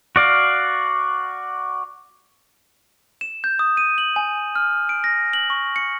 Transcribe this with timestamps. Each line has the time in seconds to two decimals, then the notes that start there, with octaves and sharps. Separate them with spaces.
0.16 F#4 D5 F5
3.21 E7
3.44 G6
3.59 D#6
3.77 D#7
3.98 F#7
4.16 G#5
4.55 F6
4.89 D7
5.04 A#6
5.33 F#7
5.50 C#6
5.76 C#7